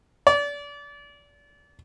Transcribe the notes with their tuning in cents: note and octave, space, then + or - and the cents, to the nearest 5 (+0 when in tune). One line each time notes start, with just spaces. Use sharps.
D5 -30